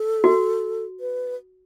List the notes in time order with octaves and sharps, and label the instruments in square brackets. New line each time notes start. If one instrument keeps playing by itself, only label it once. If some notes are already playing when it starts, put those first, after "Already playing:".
Already playing: [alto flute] A4
[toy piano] F#4
[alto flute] B4